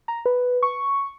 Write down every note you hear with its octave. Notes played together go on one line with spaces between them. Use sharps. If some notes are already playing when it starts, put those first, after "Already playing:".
A#5
B4
C#6